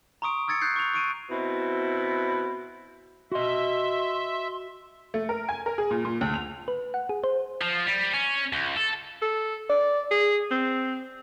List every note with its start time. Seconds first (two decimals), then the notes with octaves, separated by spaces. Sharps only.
0.22 A#5 C6 C#6 D#6 D7
0.48 D#6 E6 G#6 A6 C#7
0.61 F#6 G6 C7
0.76 C#6 F7
0.94 C#6 D7 D#7
1.30 B2 C4 E4
3.32 F#4 D#5 E5 C6
5.14 A3
5.29 A#4
5.49 G#5
5.66 A#4
5.78 G#4
5.91 A#2
6.05 A#2
6.21 D2
6.34 F7
6.68 B4
6.94 F#5
7.09 G#4
7.24 C5
7.62 F3
7.86 G3
8.14 C#4
8.53 C#2
8.77 A4
9.22 A4
9.69 D5
10.11 G#4
10.51 C4